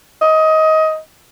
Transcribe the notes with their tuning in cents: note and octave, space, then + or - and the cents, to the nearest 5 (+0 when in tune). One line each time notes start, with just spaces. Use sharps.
D#5 +20